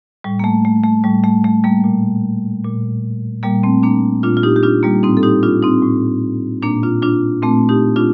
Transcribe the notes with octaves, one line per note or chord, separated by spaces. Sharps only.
A2 G3
A#3
A3
A3
A3
A2 G3
A3
A3
G3 A#3
A#2
A#2
A#2 G3 A#3
A3 C4
A#3 D4
A#2 D4 F4
F4
D#4 G4
G4
D4 F4
G3 A#3
A2 C4 D#4
A4
D#4 G4
D4 F4
C4 D#4
A2
A#2 A#3 D4
D4 F4
D4 F4
A#2 A3 C4
D#4 G4
D4 F4